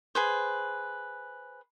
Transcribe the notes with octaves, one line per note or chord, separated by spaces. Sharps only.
G#4 B4 C5